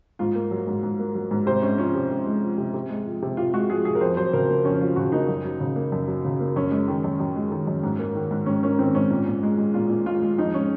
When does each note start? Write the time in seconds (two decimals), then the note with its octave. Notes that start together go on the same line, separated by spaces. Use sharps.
0.19 G#2 F4
0.35 A#3
0.51 F#3
0.67 G#2
0.83 G#2
0.99 A#3
1.15 F#3
1.31 G#2
1.46 C3 C5
1.63 G#3 C#4
1.78 F3 C#4
1.95 C3
2.11 C3
2.27 G#3
2.42 F3
2.58 C3
2.74 C3
2.90 G#3
3.06 F3
3.22 C3
3.37 C3 F4
3.54 G#3 F#4
3.70 F3 G#4
3.85 C3 G#4
3.95 A#4
4.01 F2 C5
4.17 F#3 C5
4.33 C#3 A#4
4.49 A#3
4.64 F2 C#4
4.81 F#3 F4
4.96 C#3 F#4
5.12 A#3 D#4
5.28 F#2
5.45 F#3
5.60 C#3
5.76 A#3
5.92 F#2
6.08 F#3
6.25 C#3
6.40 A#3
6.56 F#2 C#4
6.71 G#3
6.88 D#3
7.04 F#2
7.20 F#2
7.36 G#3
7.52 D#3
7.67 F#2
7.83 G#2
7.99 A#3
8.15 D#3
8.31 G#2
8.46 G#2 C#4
8.63 A#3 C#4
8.79 D#3 C4
8.95 G#2 C#4
9.10 A#2
9.27 A#2
9.43 G#3
9.58 G#3
9.74 A#2 F4
9.90 A#2
10.06 G#3 F4
10.22 G#3
10.37 F2 D#4
10.54 G#3 C#4